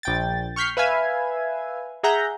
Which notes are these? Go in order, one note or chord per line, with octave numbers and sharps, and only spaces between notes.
A#1 G5 A6
C#6 F6 G6 B6 C7
B4 E5 F5 G#5 G#6
G#4 E5 F#5 A#5 G6